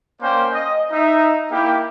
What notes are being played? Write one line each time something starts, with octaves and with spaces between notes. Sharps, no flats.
A#3 C#4 C5 D5 G5
D#5
D#4 E5
A#3 E4 G4